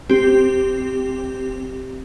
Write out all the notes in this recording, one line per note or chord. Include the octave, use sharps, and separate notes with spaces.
C4 G4